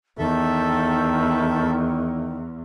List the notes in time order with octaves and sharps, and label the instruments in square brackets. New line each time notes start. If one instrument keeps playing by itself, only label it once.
[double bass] E2 [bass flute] D#3 [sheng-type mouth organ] A4 E5